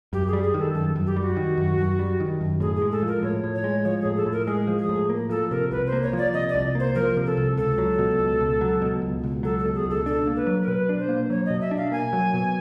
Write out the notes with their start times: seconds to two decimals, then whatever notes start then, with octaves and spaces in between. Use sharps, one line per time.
0.13 F#2 G4
0.27 G#4
0.33 G3
0.43 G#4
0.54 D#3 A4
0.74 F#2 A4
0.96 F#2
1.06 G4
1.16 G3
1.21 F#4
1.37 D#3
1.57 F#2
1.78 F#2
1.99 G3
2.20 D#3
2.41 F#2
2.60 A2 G#4
2.76 G#4
2.82 G#3
2.91 A4
3.02 F3
3.07 A#4
3.23 A2 C#5
3.44 A2
3.54 C#5
3.64 G#3
3.84 F3 C#5
4.01 A2 G#4
4.17 A4
4.26 A2
4.32 A#4
4.47 G#3 G#4
4.67 F3
4.78 G#4
4.89 A2
5.10 A#3
5.29 F3 A4
5.51 C3 A#4
5.71 C2 B4
5.87 C5
5.93 A#3
6.03 C#5
6.13 F3 D5
6.34 C3 D#5
6.49 D5
6.55 C2
6.75 A#3 C5
6.95 F3 A#4
7.17 C3
7.26 A4
7.37 C2
7.57 C#2 A4
7.78 F#3
7.99 B2
8.19 C#2
8.40 C#2
8.61 F#3
8.82 B2
9.02 C#2
9.24 C#2
9.43 F#3 A4
9.59 A4
9.65 B2
9.75 G#4
9.85 C#2 A4
10.06 D4 A4
10.27 A#3
10.36 B4
10.47 F#3
10.62 A#4
10.67 B2 B4
10.89 D4
10.99 C5
11.09 A#3
11.30 F#3 C#5
11.46 B2 D#5
11.61 E5
11.71 D4
11.77 F5
11.92 A#3 G#5
12.13 F#3
12.34 B2